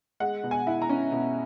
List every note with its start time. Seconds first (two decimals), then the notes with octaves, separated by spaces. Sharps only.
0.20 G#3 F#5
0.43 B2
0.51 G#5
0.67 E4
0.82 A#5
0.89 C#4
1.12 B2